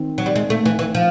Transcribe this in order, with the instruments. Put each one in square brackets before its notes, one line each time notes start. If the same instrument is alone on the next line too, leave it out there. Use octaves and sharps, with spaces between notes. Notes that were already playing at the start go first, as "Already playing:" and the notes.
Already playing: [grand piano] D#3 C4
[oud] F#3
G3
G#3
A3
E3
E3
F3